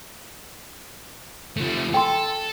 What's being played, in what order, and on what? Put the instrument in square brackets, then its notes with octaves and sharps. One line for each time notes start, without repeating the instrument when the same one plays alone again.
[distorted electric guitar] F3 A3
[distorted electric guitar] A4 [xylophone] G5 C6